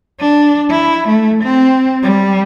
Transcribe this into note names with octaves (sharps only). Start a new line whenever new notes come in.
D4
E4
A3
C4
G3